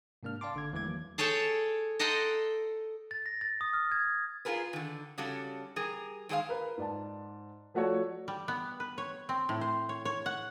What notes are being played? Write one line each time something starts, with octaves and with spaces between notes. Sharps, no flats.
G#2 C3 A#3 D4 F6
D5 F5 G5 A5 C6 D6
G1 D3 G#6
E2 E3 G#3 A3 D6 G#6
D#3 F#3 A#3
G#4 A4 C#5 G5 A5
A4 D#5 F#5 G5 A#5 C6
A6
A#6
A6
D#6
F6
G#6
F4 F#4 G#4 A#4 B4
D3 D#3
C#3 G3 C#4 F#4 A4
G3 G#4 A#4
D#3 G#3 G#4 D#5 F5
A#4 B4
G#2 D5 A5
F3 A3 F#4 A4 C#5 D5
G3
B3
B4
C#5
C4
A2
C5
C#5
C#5
F#5